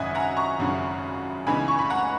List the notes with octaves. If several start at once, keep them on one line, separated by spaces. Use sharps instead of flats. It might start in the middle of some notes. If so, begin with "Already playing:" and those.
Already playing: G#1 F#2 C#3 D#5 E5 F#5 G#5
F#5 A#5
A#5 C#6
G#1 F#2 C#3
C#2 C#3 E3 B3 D#4 G#5 B5
C#6
B5
F#5 A#5